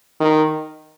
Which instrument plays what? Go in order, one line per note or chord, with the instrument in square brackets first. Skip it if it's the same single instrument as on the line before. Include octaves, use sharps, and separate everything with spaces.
[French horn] D#3